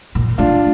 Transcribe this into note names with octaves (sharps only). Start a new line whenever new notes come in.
A#2
A3 D4 F4